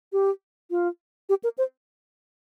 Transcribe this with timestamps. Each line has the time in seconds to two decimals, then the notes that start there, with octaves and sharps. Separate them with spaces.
0.13 G4
0.71 F4
1.29 G4
1.44 A#4
1.58 C5